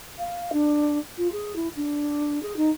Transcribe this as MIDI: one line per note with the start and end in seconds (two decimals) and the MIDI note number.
0.19 0.51 77
0.53 0.99 62
1.17 1.30 65
1.32 1.55 68
1.56 1.68 64
1.76 2.41 62
2.43 2.53 68
2.56 2.70 63